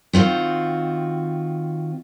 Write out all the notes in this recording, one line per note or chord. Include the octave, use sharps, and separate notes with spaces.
D#3 C4 F4 F#4